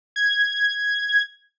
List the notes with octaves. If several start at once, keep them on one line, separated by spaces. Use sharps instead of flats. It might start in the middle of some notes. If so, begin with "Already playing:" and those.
G#6